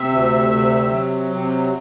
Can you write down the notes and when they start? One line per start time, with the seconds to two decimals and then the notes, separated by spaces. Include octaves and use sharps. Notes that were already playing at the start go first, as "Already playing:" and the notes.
Already playing: C3 E5
0.09 D2
0.50 C3
0.91 F#3
1.32 C3